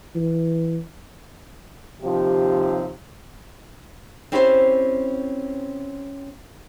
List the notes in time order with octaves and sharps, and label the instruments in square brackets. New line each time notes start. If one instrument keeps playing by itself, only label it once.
[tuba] E3
[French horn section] D#2 C3 F3 G4
[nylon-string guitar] C4 C#4 E4 G4 A4 C5